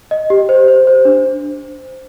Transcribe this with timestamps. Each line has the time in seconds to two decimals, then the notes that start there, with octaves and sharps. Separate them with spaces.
0.11 D#5
0.30 G4
0.49 C5
0.68 C5
0.87 C5
1.05 D4